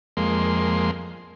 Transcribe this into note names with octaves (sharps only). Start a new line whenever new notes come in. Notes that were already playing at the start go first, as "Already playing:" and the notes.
F2 G#3 A#3 C6